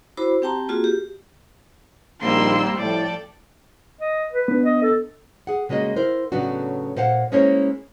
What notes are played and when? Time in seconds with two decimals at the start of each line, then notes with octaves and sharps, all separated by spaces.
0.17 E4 F#4 C5 B5 D6
0.42 C4 G4 G5 A5 A#5 C6
0.69 A#3 F4 F#4 G#4
0.84 G4
2.21 A#1 D#3 G3 A#3 C4 C6 E6
2.78 A2 F3 A4 D5 G5
4.01 D#5
4.33 B4
4.48 B3 D4
4.64 D#5
4.82 A4
5.47 G#4 F#5
5.69 C#3 G#3 A#3 F#4 D#5
5.96 E4 A#4 C5
6.32 A2 C#3 F#3 B3 D4 F#4
6.96 A#2 C5 F5 F#5
7.32 G#3 A#3 C#4 E4 C5 C#5